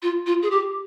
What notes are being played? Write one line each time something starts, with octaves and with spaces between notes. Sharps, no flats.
F4
F4
G#4
G4